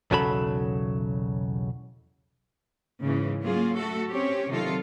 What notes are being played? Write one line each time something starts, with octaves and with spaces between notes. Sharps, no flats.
B1 E2 C#3 F#3 A4 B5
G#2 C#3 E3 A#3
F#3 A#3 C#4 F4 G#4
A3 F#4 A4
C4 C#4 G4 C#5
C3 D#3 F#3 D#4 F4 A4